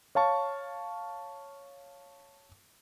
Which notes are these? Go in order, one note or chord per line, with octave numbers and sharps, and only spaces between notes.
C#5 F5 A5 C#6